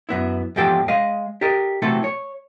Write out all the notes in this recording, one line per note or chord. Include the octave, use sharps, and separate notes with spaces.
F#2 B3 E4
E2 G#2 F3 G4 A4 G5
G#3 D#5 F5
G4 A4 A#4 D#5
C3 E3 F#3 A3 C4 A4
C#5